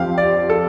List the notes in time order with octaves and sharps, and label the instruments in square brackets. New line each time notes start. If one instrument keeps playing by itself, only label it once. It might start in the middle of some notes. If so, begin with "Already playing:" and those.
Already playing: [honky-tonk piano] F2 F3 C4 G4 [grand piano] F5 G5
[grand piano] D5
A4